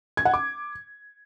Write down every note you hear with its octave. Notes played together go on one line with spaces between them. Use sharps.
G#6
F#5
D6